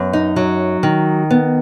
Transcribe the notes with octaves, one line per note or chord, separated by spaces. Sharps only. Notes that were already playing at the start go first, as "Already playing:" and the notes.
Already playing: F#2 B3
D#4
F#3
D#3
B3